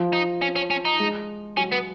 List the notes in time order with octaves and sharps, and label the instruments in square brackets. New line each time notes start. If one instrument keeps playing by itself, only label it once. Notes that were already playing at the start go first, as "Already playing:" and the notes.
Already playing: [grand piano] F3
[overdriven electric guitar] D#4
C#4
C#4
C#4
D#4
[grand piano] G#3
[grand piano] F#3 [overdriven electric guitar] C#4
[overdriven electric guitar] B3